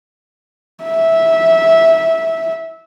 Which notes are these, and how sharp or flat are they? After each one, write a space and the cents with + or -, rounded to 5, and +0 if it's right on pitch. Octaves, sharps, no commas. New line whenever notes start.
E5 -10